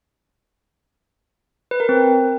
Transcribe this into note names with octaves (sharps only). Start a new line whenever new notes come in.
B4
A#4
C4